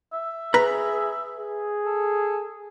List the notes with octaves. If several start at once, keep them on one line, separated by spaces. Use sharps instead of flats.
E5
G#4 B4 A#5
G#4
A4